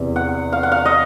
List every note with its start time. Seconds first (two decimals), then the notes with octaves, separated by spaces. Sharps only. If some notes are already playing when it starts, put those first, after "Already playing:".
Already playing: E2 C3 E3
0.16 F#5
0.52 F5
0.63 F#5
0.72 F5
0.85 D#5